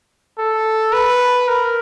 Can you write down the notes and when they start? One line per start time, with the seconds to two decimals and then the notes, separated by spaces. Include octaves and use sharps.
0.39 A4
0.93 B4
1.48 A#4